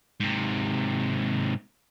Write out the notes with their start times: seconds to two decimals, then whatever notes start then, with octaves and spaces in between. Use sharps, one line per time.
0.20 G#2 C3